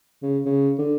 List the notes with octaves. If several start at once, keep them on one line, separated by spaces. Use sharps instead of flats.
C#3
C#3
D3